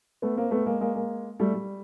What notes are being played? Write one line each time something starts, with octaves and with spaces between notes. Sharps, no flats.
A3 B3
A#3 C4
A3 B3
G#3 A#3
G#3 A#3
G#3 A#3
G3 A3
G3